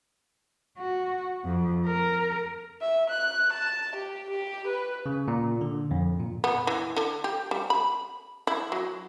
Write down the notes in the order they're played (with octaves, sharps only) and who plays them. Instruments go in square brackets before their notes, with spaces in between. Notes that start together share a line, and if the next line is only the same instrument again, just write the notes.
[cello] F#4
F2
A#4
[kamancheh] E5
F#6
A5
G4
G4
B4
[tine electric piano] C#3
A#2
D3
F2
A#2
[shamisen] B3
E3
D3
G4
G3
B5
E4
F#3